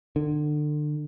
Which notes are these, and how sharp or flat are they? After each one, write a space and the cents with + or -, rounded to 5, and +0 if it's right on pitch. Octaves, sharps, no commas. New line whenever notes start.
D3 +30